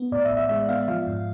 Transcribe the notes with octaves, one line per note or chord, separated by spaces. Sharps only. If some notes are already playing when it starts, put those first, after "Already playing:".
Already playing: B3
A2 D5
E5
A1
E5
G#3 E5
B3 F5
F3 F5
G#2